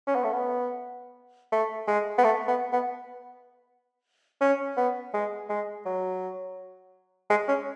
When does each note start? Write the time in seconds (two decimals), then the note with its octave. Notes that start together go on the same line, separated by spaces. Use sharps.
0.07 C#4
0.15 B3
0.24 A3
0.33 B3
1.52 A3
1.87 G#3
2.18 B3
2.24 A3
2.48 B3
2.72 B3
4.41 C#4
4.77 B3
5.13 G#3
5.49 G#3
5.86 F#3
7.30 G#3
7.48 C#4